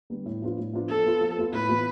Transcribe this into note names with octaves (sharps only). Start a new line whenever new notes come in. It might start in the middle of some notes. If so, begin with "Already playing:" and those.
D3 G3 B3 D4
A2
F3 B3 D4 F4
A2
F3 B3 D4 F4
F3 A4
B3 F4
F3
B3 F4
A2 B4
E3 B3 F4